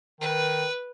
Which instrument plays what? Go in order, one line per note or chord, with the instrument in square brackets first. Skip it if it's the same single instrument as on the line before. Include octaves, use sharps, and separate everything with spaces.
[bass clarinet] D#3 [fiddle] B4